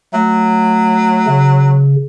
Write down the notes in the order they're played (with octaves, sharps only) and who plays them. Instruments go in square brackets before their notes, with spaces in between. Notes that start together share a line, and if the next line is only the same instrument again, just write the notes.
[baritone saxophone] F#3 [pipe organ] A3
[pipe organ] C#3